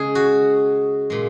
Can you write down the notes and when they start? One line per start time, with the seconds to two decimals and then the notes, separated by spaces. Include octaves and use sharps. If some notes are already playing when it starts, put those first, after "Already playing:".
Already playing: C#3 G#3 G#4
0.15 F#4
1.10 A#2 G#3